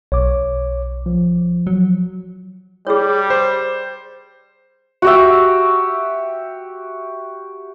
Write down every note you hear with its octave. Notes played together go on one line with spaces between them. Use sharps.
B1 C#5 D6
F3
F#3
G3 G#4 C#5
C5
F#4 G4 E5